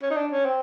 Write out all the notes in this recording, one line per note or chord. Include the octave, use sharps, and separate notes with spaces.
C#4
D#4
D4
C#4
C4